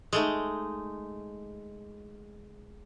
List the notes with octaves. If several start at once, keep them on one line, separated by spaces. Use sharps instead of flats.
G#3 A3 D#4